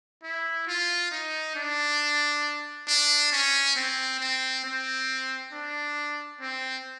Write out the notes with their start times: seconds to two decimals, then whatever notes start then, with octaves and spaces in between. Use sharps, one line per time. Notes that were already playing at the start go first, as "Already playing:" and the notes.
0.23 E4
0.67 F4
1.11 D#4
1.55 D4
2.88 D4
3.32 C#4
3.76 C4
4.20 C4
4.64 C4
5.52 D4
6.40 C4